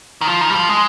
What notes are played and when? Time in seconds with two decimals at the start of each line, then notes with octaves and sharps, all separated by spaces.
0.21 D#3
0.27 F3
0.41 D#3
0.50 G3
0.55 F3
0.69 G#3